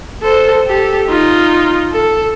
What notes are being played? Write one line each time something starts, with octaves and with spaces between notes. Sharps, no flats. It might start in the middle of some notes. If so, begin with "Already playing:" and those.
A4 C5
G4 A4
D#4 F4
A4